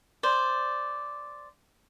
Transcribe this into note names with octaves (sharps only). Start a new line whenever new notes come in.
C5 D5